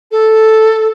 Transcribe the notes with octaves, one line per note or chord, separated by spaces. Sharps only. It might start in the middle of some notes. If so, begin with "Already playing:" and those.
A4